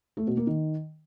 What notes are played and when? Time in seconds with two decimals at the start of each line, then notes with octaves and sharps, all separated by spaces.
0.17 A3
0.27 B2
0.37 A#3
0.47 D#3